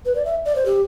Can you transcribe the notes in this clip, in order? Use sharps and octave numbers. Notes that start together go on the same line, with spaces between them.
B4
D5
E5
D5
C5
G4